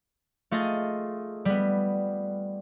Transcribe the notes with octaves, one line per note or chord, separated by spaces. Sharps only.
A3 F4 G#4 D#5
G3 B3